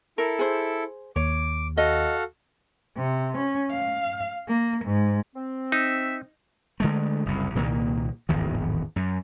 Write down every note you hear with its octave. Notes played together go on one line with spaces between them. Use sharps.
E4 A4 A#4
G#4 C5
D#2 C#5 D6
F#4 A4 D#5 F5
C3
C#4
F5
A#3
G#2
C4
D#4 E5
D3 G#3 A3
F#1 C2
C2 A#2 D#3 A#3
D1 G#1 E2 D#3
F#2